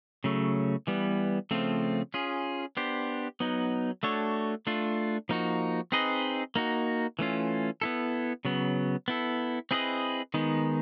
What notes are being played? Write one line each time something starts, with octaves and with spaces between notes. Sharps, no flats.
C#3 F#3 A3
E3 G3 B3
C#3 F3 A3 C4 F4
C#4 F4 G#4
B3 D4 G4 C5
F#3 B3 D#4
A3 D4 F#4 A4 C#5
A3 D4 F4
F3 A#3 D#4 F#4
C4 D#4 G#4 B4 D#5
A#3 D#4 F#4
E3 A3 C#4 F4
B3 E4 A4
C#3 F#3 B3
B3 E4 A4
C4 E4 G#4 B4 D#5
D#3 G#3 B3 D#4